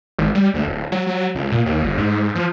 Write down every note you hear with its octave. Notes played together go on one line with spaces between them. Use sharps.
G#1
G3
D2
D1
F#3
F#3
C#2
A#2
D#2
G1
G#2
F3